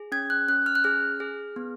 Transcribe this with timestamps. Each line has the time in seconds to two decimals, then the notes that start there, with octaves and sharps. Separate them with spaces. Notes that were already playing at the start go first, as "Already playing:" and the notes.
Already playing: G#4
0.12 C#4 G#6
0.30 F#6
0.48 C#4 F#6
0.66 F6
0.75 F#6
0.84 G#4 F6
1.20 G#4
1.56 B3